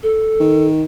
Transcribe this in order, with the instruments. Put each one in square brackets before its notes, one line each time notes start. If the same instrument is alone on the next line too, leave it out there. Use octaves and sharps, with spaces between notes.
[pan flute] A4
[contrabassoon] D#3